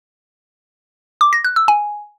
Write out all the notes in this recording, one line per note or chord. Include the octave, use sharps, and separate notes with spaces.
D6
A#6
F#6
E6
G#5